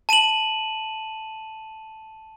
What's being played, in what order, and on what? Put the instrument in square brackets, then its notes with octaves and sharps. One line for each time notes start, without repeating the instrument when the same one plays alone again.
[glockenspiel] A5 D#7 E7 F#7